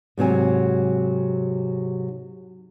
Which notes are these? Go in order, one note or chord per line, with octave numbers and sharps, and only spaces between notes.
G#2 C3 F#3 G#5